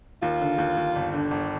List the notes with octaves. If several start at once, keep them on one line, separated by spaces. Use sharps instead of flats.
D#2 F4
D3
D#2
D#2
G1
D3
G1